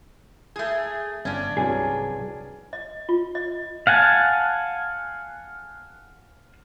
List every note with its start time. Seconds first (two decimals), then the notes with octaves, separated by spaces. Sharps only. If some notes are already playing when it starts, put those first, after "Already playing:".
0.56 A3 G#4
1.25 G1 C#4 D4
1.57 C2 G2 F#3 G#4
2.73 D#5
3.09 F4
3.35 D#5
3.87 F5 F#5 G#5 A5